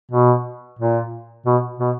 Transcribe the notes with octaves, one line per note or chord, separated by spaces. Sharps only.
B2
A#2
B2
B2